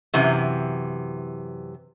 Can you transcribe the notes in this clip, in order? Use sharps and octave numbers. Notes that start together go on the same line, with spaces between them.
F#2 C3 E3